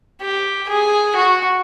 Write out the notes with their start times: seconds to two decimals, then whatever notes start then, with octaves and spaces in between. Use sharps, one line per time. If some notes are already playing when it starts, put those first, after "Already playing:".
0.22 G4
0.69 G#4
1.16 F#4